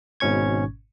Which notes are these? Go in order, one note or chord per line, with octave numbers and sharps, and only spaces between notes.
G#1 G#2 B2 C#4 C#6 G#6